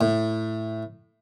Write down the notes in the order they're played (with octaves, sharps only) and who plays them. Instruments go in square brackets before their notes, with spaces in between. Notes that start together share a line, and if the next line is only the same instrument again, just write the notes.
[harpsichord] A2